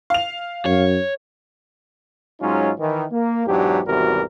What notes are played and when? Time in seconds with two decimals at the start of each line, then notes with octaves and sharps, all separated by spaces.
0.10 F5 F7
0.66 F#2 C#5
2.41 G#2 F#3 G#3 C#4 D#4 F4
2.79 D#3 E3
3.11 A#3
3.47 E2 G#2 F#3 D4 G4
3.86 G#1 E2 C3 G3 F#4 A#4